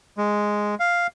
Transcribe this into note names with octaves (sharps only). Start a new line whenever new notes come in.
G#3
F5